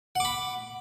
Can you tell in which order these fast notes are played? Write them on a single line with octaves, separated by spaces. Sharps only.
F#5 D6 B5